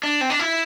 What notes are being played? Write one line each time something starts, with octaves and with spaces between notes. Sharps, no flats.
D4
C4
D4
E4